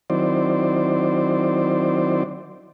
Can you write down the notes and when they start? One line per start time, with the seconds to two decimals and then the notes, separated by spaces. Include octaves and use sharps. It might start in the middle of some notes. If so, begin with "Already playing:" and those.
0.10 D#3 F#3 C4 E4 C5 D5